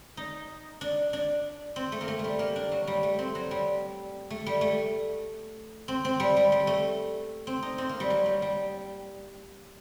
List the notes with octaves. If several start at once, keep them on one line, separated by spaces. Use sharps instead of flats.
D#4
D4
D4
C4
A3
A#3
A3
A3
G3
A#3
D4
F#3
G3
A3
C4
F#3
G3
A3
G3
A3
C4
C4
G3
G3
G3
A3
C4
D#4
C4
A#3
G3
F#3
G3
G3